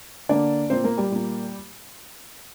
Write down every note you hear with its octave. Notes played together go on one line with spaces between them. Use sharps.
D3 A#3 D4 D5
A#2 A#3 C4 C5
A#3 A#4
G3 G4
A#2 A#3